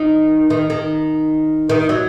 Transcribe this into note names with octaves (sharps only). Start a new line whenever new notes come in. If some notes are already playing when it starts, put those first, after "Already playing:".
Already playing: D#3
D#3
D#3
D#3
F#3